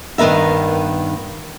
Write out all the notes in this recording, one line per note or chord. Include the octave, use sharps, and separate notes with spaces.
G2 D#3 B3 A#4 E5